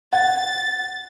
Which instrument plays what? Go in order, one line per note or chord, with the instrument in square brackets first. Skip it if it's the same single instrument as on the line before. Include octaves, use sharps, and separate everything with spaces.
[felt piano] F#5 [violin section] A6